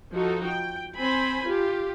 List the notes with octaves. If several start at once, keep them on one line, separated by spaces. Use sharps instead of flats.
F3 D#4 F#4 A4
G5
C4 C5 G#5 B5
F4 G4